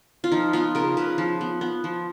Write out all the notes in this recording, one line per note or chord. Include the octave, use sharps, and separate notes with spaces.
F4
F3 D#4
B3 F4
C#3 A#4
C#3 B4
F3
B3
B3
F3